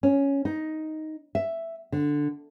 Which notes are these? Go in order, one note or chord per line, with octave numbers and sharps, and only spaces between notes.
C#4
D#4
E5
D3